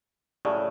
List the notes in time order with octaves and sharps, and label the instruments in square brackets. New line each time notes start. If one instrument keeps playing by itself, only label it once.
[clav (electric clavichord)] A2 C#3 [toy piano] G4 D5 A5 C#6